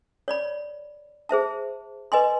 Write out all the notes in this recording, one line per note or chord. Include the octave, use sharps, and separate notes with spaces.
C#5 D5 B5
G#4 C5 E5 A5
B4 D#5 G#5 C6